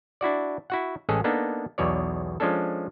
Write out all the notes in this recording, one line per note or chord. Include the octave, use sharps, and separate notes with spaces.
D4 E4 F#4 D5
E4 F#4 F#5
A1 G#3 C#4 G#4 A4
A#3 B3 D4 D#4 A4
B1 E2 B2 C#5 D5
F3 G#3 C#4 D4 A4